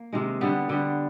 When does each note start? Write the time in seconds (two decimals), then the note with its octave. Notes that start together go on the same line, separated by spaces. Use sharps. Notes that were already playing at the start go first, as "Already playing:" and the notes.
Already playing: A#3
0.13 C3 D#3 G#3
0.41 D3 G3 B3
0.69 D3 G3 B3